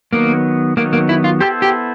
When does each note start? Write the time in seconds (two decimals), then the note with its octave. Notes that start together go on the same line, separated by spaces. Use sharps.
0.13 D#3 F#3 A#3 B3
0.77 D#3 F#3 A#3 B3
0.93 A#3
1.09 E4
1.24 F4
1.40 B3 E4 G4 A4 C5
1.62 G4